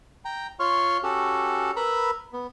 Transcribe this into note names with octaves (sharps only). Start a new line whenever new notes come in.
G5 A#5
F4 C#5 C6 C#6 F6
C#4 F#4 G4 A4
A#4 B4 A#5 B5 E6
B3